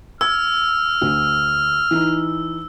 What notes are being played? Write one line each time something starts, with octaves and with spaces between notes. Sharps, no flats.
E6 F6 G#6
D2
E3 D#4